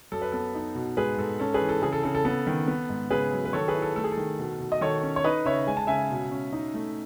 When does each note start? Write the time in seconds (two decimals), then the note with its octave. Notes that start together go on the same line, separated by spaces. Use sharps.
0.12 F#2 A4
0.22 B4
0.32 B3 A4
0.55 D#4
0.75 B2
0.97 G#2 G#4 B4
1.18 G#2 A4
1.39 C#4 A4
1.54 G#4 B4
1.60 E3
1.69 A4
1.82 C#3 G#4
1.93 A4
2.04 C#3 A4
2.15 A4
2.25 B3 A4
2.47 D#3
2.68 B3
2.89 G#2
3.10 C#3 G#4 B4
3.31 F#3
3.45 B4
3.53 D#3 A4 C#5
3.68 G#4 B4
3.74 E4
3.82 A4
3.96 A3 A4
4.04 G#4
4.12 A4
4.17 D#3
4.39 B2
4.60 B2
4.72 D#5
4.81 D#3 A4 C#5
5.03 C#4
5.16 C#5
5.24 D#4 B4 D#5
5.45 C#3 C#5 E5
5.67 G#3 G#5
5.77 A5
5.87 C#3 E5 G#5
6.10 B2
6.31 C#4
6.53 D#4
6.74 A3